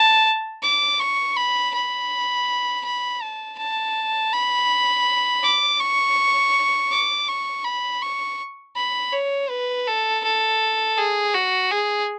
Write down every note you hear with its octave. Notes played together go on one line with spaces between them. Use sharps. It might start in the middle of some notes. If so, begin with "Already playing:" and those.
Already playing: A5
D6
C#6
B5
B5
B5
A5
A5
B5
D6
C#6
D6
C#6
B5
C#6
B5
C#5
B4
A4
A4
G#4
F#4
G#4